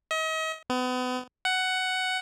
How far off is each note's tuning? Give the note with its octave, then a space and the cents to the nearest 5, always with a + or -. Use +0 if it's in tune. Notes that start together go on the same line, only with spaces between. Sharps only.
D#5 +40
B3 +35
F#5 +10